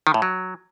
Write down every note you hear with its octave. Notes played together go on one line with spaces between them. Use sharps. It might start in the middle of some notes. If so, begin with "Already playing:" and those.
D#3
A2
F#3